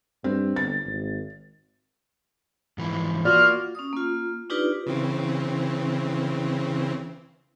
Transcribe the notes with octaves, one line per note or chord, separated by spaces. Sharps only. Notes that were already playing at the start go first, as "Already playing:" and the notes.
G2 C4
G1 A6
G#1
G#2 E3 F3
A#3 F4 F#4 D5 F6
C#4 D#6
A#3 F4
D4 D#4 F4 G4 B4 D5
C#3 E3 C4